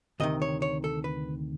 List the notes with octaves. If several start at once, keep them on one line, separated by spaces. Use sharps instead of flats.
D2 C3 D#3 D#5
C#5
C#5
A4
B4